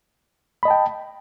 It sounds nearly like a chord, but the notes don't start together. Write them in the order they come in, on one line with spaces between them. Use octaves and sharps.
B5 D#5 A5 G5